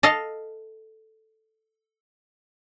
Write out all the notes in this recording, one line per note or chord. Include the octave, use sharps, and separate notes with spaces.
A4 D#5 F5 A5